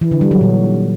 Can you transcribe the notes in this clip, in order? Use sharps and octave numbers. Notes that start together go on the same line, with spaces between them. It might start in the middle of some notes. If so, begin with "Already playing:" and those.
E3
D3
G3
F#3
A#2